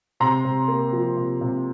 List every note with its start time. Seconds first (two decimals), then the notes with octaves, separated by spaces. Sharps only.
0.20 C3 A#5 C6
0.45 C3
0.68 A#3
0.92 F3
1.17 C3
1.41 C3